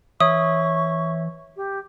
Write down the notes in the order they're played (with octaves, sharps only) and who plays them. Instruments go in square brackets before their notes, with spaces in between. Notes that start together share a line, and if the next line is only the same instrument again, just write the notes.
[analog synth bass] E3 [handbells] C#5 E5 [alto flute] C#6 [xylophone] D#6
[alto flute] G4